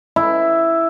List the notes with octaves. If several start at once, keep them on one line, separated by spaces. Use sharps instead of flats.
E4